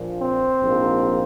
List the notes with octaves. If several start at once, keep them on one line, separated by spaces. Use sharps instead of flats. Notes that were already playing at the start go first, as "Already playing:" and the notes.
Already playing: A#1 A#2 F3
C4
A#1 G#2 F3 A#3